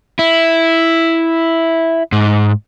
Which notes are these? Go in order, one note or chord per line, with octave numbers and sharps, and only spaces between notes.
E4
G#2